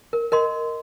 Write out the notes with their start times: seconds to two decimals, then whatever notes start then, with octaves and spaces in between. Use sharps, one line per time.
0.13 A#4
0.32 A#4 D#5 C6